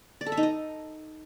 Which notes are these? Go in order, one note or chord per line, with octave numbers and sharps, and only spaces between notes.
D5
A4
E5
D#4
D#5